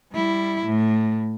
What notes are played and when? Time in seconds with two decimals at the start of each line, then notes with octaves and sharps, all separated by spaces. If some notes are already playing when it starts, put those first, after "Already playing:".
0.12 G3 E4
0.66 A2